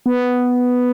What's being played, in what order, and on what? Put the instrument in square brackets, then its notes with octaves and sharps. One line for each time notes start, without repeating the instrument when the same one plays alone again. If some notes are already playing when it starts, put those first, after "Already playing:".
[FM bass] B3